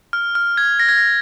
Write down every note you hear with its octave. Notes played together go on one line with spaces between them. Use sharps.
F6
F6
G#6
A#6
G#6
A#6